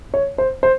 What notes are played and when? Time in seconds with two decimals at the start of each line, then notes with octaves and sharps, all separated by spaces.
0.14 C#5
0.38 C5
0.63 C5